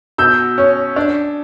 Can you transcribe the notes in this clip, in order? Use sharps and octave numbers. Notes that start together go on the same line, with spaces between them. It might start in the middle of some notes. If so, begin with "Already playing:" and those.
B2 E6 G6
C#4
D4